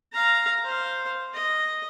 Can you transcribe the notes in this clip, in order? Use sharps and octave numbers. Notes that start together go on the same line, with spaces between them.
F5 A#5
C5 F5
D#5